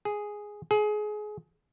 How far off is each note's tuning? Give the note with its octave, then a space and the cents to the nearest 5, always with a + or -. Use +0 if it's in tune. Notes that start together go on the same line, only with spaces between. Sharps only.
G#4 +0
G#4 +25